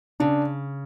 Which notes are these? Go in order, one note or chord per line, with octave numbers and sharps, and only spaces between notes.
C#3 D4